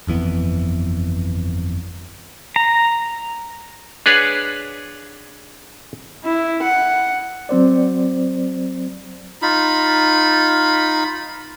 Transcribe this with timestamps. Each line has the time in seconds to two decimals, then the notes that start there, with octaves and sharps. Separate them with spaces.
0.07 G1 F2 E3 B3
2.56 A#5
4.06 D4 G#4 B4 C#5 F#5
6.24 E4
6.62 F#5
7.49 F#3 C4 C5 D5
9.42 D#4 F4 B5